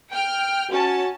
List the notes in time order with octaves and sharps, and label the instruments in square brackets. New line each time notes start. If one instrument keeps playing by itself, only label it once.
[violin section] G5 F6
[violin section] C#4 A5 [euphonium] F#4